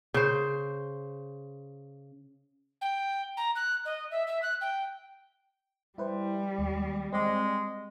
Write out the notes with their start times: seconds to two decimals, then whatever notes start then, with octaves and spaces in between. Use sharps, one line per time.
0.14 C#3 C5
2.81 G5
3.37 A#5
3.55 F#6
3.85 D#5
4.11 E5
4.27 E5
4.42 F#6
4.61 G5
5.98 G3 E4 B4 C5
6.59 D#2
7.13 G#3 C4 D5